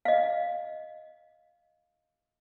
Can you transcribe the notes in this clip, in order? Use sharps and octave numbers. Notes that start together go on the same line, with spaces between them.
D#5 F5